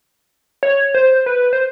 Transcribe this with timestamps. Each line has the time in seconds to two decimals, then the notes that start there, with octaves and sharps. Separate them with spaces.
0.63 C#5
0.94 C5
1.26 B4
1.53 C5